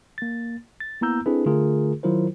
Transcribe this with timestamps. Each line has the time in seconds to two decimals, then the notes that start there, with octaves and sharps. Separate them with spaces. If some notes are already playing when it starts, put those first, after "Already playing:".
0.18 A#3 A6
0.80 A6
1.01 A#3 B3 E4 A#5 E6 G6
1.26 C4 D4 E4 G#4 A4 B4
1.46 D3 A3 F4 G#4 A#4
2.03 D#3 F#3 E4 F4 A#4 C5